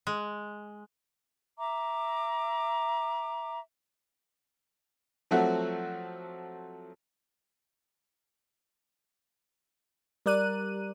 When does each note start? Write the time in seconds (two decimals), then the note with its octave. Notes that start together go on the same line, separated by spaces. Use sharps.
0.07 G#3
1.58 E5 A#5 D6
5.31 F3 F#3 A3 C4 F#4 E5
10.26 G3 A#4 D5 F#6 D#7